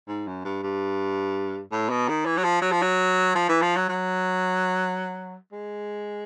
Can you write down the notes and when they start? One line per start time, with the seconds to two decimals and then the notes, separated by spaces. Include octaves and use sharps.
0.08 G#2
0.27 F#2
0.45 G2
0.63 G2
1.72 A2
1.90 B2
2.08 D#3
2.26 E3
2.37 F#3
2.44 F3
2.62 F#3
2.72 F3
2.82 F#3
3.35 F3
3.49 E3
3.62 F3
3.76 F#3
3.89 F#3
5.52 G#3